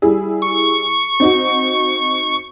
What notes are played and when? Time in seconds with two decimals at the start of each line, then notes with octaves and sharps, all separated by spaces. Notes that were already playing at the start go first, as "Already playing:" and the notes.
0.02 G3 E4 G#4
0.42 C#6
1.20 C4 D#4 F#4